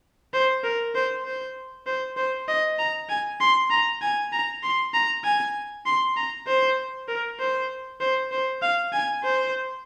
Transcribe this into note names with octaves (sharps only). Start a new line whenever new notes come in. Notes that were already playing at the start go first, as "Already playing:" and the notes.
C5
A#4
C5
C5
C5
C5
D#5
A#5
G#5
C6
A#5
G#5
A#5
C6
A#5
G#5
C6
A#5
C5
A#4
C5
C5
C5
F5
G#5
C5